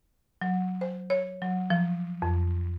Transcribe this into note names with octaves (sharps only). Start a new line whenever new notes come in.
F#3
C5
C#5
F#3
F3
F2